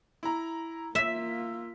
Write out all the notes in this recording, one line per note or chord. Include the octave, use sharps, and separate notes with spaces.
E4 A#5
A#3 F4 E5 E6 B6